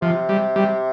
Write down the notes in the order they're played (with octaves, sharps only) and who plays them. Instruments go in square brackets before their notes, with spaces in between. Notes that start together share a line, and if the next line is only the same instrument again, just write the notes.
[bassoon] C3 [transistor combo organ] F3
[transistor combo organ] G3
G3